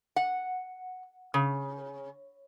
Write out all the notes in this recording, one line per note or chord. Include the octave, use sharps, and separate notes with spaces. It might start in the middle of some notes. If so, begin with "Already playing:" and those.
F#5
C#3